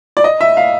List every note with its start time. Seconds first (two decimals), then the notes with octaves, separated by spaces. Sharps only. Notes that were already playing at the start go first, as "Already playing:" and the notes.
0.17 D5
0.24 D#5
0.41 E5
0.57 F5